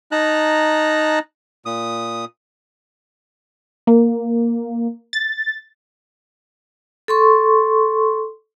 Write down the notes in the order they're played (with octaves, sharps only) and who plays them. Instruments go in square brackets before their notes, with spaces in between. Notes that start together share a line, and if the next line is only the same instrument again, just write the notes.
[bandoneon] D#4 A5 A#5 F#6
A#2 D#6
[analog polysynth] A#3
A6
[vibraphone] A4 C6 C#6